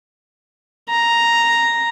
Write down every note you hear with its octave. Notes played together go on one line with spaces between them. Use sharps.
A#5